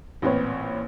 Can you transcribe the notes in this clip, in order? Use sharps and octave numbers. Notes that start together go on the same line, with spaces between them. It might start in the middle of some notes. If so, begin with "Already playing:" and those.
A1 A#2 C4 B4 C#5